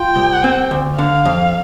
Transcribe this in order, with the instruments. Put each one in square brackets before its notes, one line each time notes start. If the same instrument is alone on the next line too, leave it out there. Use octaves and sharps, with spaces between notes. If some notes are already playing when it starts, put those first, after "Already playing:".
Already playing: [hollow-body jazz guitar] F4 [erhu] G5
[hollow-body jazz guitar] C2
C4
D2
[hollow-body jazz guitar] D3 [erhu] F5
[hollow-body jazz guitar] F2